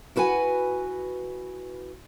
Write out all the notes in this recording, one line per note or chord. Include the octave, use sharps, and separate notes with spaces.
E4 F#4 B4 F#5 G#5